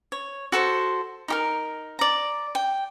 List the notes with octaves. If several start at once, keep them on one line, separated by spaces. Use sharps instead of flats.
C#5
F#4 A4 B4 C5
D#4 G4 A#4
D5 A#5
G5